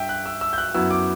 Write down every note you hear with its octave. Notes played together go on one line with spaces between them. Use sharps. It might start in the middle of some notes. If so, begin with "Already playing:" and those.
Already playing: G2 E5 G5
F#6
E6
E6
G6
F#6
F#2 F#3 B3 E4 E6
D6